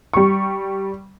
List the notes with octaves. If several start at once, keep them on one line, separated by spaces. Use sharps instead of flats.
G3 C#6